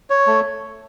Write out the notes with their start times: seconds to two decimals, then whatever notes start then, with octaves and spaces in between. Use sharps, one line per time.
0.10 C#5
0.27 A3